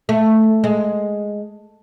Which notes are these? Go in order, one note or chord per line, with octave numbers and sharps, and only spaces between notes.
A3
G#3